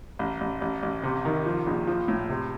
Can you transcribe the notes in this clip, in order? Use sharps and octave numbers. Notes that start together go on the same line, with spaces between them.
A1
A1
A1
A1
C3
D#3
F3
A#1
F3
A2
C3